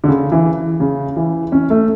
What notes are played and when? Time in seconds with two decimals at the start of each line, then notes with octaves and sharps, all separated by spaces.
0.04 D3
0.08 C#3
0.32 E3
0.80 C#3
1.16 E3
1.52 C#4
1.70 A3